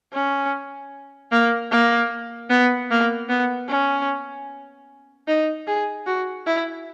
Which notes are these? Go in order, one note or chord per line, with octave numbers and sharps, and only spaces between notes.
C#4
A#3
A#3
B3
A#3
B3
C#4
D#4
G#4
F#4
E4